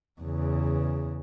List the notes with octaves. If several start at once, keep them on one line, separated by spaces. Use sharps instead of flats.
E2 C#3